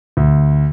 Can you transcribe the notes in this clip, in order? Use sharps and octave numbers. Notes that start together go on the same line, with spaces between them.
D2